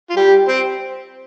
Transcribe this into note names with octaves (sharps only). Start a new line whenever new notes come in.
F4
G3 G4
C4 C5